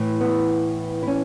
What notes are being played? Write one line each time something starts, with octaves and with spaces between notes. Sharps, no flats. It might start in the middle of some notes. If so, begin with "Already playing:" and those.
Already playing: A2 E3
B3
E4
C#4